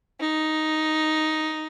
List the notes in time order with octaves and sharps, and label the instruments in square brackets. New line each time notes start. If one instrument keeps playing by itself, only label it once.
[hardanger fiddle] D#4